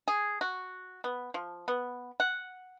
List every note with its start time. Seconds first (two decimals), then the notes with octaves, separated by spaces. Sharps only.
0.08 G#4
0.41 F#4
1.04 B3
1.34 F3
1.68 B3
2.20 F#5